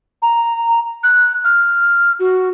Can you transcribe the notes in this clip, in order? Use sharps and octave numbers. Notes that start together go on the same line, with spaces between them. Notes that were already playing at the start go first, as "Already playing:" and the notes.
A#5
F#6
F6
F#4